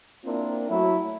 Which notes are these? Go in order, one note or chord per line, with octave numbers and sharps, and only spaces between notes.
A#3 C4 D4 E4 F4 A#4
F#3 A3 E4